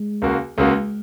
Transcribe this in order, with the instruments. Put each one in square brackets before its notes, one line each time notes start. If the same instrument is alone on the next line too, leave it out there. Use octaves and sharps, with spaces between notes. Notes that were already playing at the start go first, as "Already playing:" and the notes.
Already playing: [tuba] G#3
[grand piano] C#2 C#3 A#3 F#4
[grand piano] C#2 C#3 A#3 F#4 [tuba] G#3